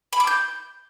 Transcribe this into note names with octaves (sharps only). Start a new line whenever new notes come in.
B5
D6
G6